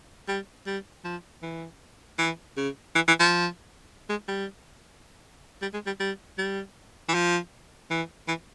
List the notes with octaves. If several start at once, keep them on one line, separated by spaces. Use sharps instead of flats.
G3
G3
F3
E3
E3
C#3
E3
E3
F3
G#3
G3
G3
G#3
G3
G3
G3
E3
F3
E3
E3